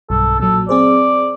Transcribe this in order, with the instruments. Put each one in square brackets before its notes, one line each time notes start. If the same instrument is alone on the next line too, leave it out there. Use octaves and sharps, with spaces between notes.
[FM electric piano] B1 G2 [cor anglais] A4
[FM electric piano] A#2 F#3 [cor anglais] A4
[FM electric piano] C4 G#4 C5 [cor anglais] D5